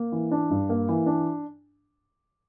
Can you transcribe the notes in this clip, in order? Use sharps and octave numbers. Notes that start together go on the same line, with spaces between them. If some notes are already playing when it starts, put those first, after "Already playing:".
Already playing: A#3
E3
D4
G2
A#3
E3
D4